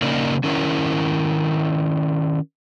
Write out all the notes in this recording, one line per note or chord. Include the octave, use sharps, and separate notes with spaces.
C#3 A#3 C#4 D#4 A#4 D5
D#3 C#4 E4 A#4